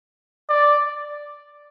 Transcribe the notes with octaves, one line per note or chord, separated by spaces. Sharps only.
D5